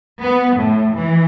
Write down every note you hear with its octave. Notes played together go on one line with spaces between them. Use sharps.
B3
A2
E3